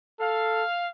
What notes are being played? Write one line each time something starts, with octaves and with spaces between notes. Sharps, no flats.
A4 F5